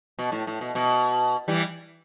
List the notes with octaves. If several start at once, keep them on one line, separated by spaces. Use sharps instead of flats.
B2
A2
A2
B2
B2
E3 G3